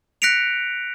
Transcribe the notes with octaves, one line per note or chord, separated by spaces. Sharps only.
F#6 A#6 B6 C#7 D7 F7